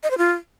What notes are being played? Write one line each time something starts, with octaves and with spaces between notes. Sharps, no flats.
D#5
C5
F4